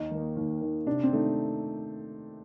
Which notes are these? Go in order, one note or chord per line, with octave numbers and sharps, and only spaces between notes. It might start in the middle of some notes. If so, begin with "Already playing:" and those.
Already playing: D#2 D#4
D#3 A#3
D#2
D#3 A#3
C3 D4
C4
D#3 A3 D#4